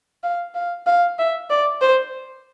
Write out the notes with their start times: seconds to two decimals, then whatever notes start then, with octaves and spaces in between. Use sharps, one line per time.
0.24 F5
0.55 F5
0.87 F5
1.19 E5
1.50 D5
1.81 C5